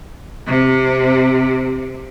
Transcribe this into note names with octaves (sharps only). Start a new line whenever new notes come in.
C3 C4